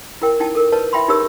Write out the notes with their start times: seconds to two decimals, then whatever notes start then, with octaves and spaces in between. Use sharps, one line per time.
0.22 E4 A#4 G5
0.40 D#4 E4 G5 A5
0.55 A4 A#4
0.72 B4 C#5 D#5 A5
0.93 E4 E5 G5 B5 C6
1.08 D#4 G4 G#4 A#4 C#5 E6